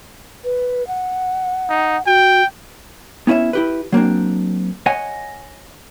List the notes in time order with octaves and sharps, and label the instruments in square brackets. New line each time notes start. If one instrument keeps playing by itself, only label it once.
[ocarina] B4
F#5
[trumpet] D#4
[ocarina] F#4 [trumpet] G5
[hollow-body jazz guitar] B3 C#4 E4 D#5 E5
E4 G4 B4
F#3 A#3 C4 D4
C#5 D#5 F#5 G#5